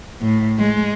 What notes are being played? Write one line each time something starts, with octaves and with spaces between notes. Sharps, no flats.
A2
G#3